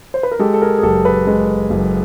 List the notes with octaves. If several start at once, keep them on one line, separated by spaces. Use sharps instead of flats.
C5
B4
A#4
G#3 G4 A4
A4
G#4 A#4
G#4
F#1 G4 A4
A4 B4
G#3
F#1